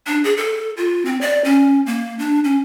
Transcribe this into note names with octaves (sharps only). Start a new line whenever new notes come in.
D4
G#4
A4
F4
C4
D5
C#4
A#3
D4
C#4